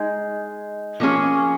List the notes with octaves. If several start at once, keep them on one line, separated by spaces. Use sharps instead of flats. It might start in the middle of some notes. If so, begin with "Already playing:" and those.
Already playing: G#3 D#4 G#4
F3 A#3 C#4 G#4